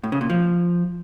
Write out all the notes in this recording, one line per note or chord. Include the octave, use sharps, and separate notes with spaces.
A2
C#3
A#2
F3